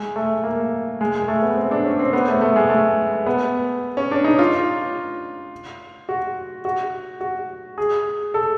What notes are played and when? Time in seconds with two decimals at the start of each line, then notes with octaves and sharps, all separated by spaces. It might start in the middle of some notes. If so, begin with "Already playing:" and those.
Already playing: G#3
0.16 A3
0.43 A#3
1.01 G#3
1.15 G#3
1.28 A3
1.42 B3
1.57 C4
1.71 D4
1.86 C#4
1.99 C4
2.13 B3
2.28 A3
2.41 A3
2.56 G#3
2.69 A3
3.26 B3
3.97 C#4
4.11 D4
4.24 D#4
4.39 F4
6.09 F#4
6.65 F#4
7.21 F#4
7.78 G#4
8.34 A4